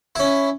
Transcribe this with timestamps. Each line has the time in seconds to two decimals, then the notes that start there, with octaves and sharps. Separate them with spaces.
0.16 C#4 E4